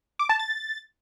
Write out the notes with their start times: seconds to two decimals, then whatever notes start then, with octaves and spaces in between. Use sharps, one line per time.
0.19 D6
0.29 A5
0.39 A6